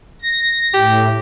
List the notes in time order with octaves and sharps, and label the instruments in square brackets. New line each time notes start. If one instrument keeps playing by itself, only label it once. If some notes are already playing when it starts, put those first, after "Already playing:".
[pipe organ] A#6
[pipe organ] A2 [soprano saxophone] G4